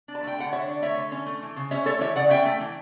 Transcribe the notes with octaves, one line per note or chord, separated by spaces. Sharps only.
D4
A5
A3 G5
D3 F#5
D3 C#5 E5
D4
A3 C#5 E5
D3
C#4
A3
E3
C#3
C#4 C#5 E5
A3 A4 C#5
E3 C#5 E5
C#3 D5 F#5
C#4 E5 G5
A3
E3